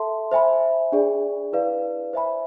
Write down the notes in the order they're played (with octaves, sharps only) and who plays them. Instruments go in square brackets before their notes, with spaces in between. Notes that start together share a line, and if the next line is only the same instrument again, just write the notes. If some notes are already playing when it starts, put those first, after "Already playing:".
Already playing: [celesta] A4 E5 A5 C6
C5 E5 G#5 B5
D4 G#4 D5
E4 B4 D5 F5
C5 E5 G#5 B5